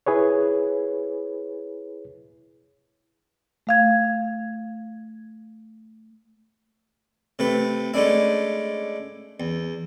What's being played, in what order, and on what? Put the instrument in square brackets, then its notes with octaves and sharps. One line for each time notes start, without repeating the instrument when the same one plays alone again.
[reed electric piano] E4 G#4 B4 C#5
[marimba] A3 F5 G#6
[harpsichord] C3 A3 B4
G#3 A3 C#4 D4 E4
E2